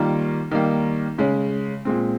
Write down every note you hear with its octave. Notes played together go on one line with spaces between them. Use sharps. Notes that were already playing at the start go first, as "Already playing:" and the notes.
Already playing: D#3 G3 A#3 F4
D#3 G3 A#3
C#3 G#3 C#4
A#2 G#3 C4